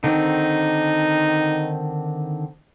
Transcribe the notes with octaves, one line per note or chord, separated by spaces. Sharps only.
D3 D#3 C4 D#4